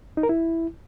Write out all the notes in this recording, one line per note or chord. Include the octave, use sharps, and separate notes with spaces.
D#4
A#4
E4